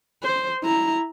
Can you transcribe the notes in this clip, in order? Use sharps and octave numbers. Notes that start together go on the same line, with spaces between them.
C5
E4 A#5